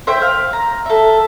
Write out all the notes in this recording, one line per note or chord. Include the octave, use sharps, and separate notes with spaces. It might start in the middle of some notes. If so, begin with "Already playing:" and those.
C5 E5 G5
F5
A#5
A4 E5